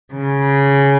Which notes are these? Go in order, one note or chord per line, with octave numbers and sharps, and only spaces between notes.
C#3